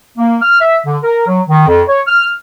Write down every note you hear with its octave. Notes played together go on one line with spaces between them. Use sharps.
A#3
F6
E5
D3
A#4
F#3
D#3
F2
C#5
F6